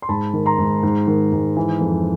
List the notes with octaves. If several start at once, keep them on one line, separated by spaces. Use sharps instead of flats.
C6
G#2 A5 B5
D#3
A#5 C6
G#2
G#2
D#3
G#2
E3
F2